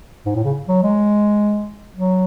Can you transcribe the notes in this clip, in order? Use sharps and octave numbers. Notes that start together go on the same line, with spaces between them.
G#2
A2
C#3
F#3
G#3
F#3